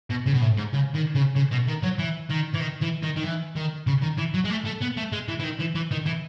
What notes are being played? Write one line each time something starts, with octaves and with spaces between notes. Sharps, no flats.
B2
C#3
B2
A2
G#2
C#3
D#3
C#3
C#3
B2
D#3
F#3
E3
D#3
E3
D#3
E3
D#3
D#3
E3
D#3
C#3
D#3
E3
F#3
G#3
A3
A3
B3
A3
G#3
E3
E3
D#3
E3
E3
D#3
E3